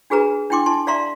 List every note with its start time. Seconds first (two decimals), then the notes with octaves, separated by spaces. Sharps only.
0.10 D4 F#4 G#4 B4 A#5
0.50 D4 E4 G5 C6 D6
0.66 E4 A5 C6
0.87 D5 E5 F5 A#5 C6